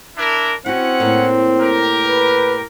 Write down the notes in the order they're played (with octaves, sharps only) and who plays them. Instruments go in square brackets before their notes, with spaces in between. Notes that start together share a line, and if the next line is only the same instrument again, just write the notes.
[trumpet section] D4 E4 A#4
[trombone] C4 [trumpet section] C#4 F#5 [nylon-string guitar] E4 F#4
[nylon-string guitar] A2 A#3
[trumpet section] G4 A#4
[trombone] B4